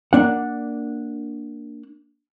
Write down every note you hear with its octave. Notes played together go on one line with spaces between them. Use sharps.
A#3 D4 F#5